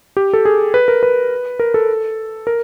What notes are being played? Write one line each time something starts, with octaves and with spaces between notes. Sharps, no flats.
G4
A4
G#4
B4
A#4
B4
A#4
A4
A#4